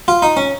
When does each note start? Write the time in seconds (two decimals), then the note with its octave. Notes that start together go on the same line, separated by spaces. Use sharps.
0.08 F4
0.22 D#4
0.37 C#4